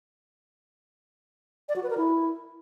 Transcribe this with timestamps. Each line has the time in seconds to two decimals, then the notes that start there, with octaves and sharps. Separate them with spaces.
1.69 D5
1.76 F#4
1.83 B4
1.90 A#4
1.97 E4